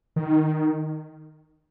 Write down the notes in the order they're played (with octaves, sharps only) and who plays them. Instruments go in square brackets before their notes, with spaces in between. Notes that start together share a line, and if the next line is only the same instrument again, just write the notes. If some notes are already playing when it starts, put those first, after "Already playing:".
[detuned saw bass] D#3